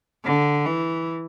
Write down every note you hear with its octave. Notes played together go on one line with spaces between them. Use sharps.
D3
E3